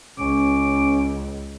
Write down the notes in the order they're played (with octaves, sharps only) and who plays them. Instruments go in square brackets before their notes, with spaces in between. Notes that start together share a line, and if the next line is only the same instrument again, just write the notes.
[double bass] C#2 [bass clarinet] C#4 [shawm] D6